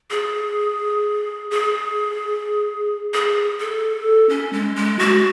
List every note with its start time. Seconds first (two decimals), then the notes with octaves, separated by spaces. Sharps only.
0.11 G#4
1.51 G#4
3.14 G#4
3.60 A4
4.29 C#4
4.53 G#3
4.76 G#3
4.99 F#4